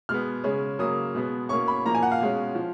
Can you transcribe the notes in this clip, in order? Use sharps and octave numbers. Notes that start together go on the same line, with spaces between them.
B2 G#3 B3 F6
C#3 G#3 C#4
C#3 F#3 A#3 C#4 D#6
B2 G#3 B3
B2 A#3 C#4 C#6
B5
A#2 F3 A#3 A#5
G#5
F#5
F5
B2 G#3 C#4
F3